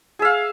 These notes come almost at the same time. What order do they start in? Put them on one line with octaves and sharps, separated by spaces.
G#4 E5 F5